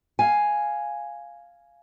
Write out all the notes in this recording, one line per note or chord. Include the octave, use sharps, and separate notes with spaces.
F5 G#5